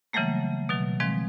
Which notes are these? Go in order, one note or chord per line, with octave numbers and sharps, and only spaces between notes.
C#3 E3 F#3 G3 A3 A#3
B2 D#3 F#3
D#3 F3 G#3 C4